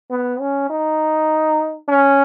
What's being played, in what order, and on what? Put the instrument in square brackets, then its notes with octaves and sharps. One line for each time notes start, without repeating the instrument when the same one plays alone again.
[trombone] B3
C#4
D#4
C#4